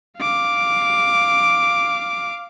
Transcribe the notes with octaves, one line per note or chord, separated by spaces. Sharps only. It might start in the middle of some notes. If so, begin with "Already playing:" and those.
F5 D6